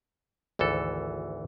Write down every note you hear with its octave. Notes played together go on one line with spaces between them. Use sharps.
G#1 D2 E3 A4